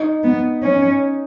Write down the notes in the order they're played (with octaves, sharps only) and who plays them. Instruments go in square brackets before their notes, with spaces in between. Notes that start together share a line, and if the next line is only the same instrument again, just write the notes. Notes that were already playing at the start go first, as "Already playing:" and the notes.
Already playing: [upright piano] D#4
[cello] B3
C#4